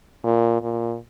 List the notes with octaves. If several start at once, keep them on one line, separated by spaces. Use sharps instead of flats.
A#2
A#2